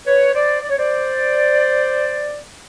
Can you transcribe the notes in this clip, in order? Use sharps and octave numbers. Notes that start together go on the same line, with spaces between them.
B4 C#5
C5 D5
D5
C#5
C5 D5